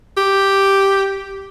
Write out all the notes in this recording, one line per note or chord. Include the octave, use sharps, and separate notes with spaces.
G4